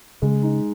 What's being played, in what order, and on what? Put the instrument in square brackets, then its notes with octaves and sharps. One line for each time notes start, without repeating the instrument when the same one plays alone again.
[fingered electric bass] C#3 [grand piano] G#3
[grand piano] D#4